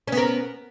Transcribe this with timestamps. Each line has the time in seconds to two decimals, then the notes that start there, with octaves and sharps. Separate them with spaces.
0.07 C#4
0.12 B3
0.17 A#4